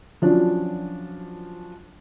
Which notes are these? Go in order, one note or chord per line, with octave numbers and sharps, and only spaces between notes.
F3 F#3 C#4 D4 F4